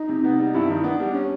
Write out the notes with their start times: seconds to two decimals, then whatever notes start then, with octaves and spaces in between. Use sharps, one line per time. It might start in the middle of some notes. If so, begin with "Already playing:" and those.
Already playing: D#4
0.09 C3
0.24 B3
0.39 G3
0.54 G2 E4
0.70 D#3 D#4
0.84 B3 D4
1.00 G3
1.14 C#4